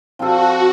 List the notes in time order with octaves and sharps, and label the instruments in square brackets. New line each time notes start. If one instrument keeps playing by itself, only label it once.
[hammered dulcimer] F3 C4 F4 A4 [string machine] F#4